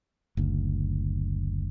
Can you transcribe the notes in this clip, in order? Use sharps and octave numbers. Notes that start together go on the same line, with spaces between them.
F#1 D2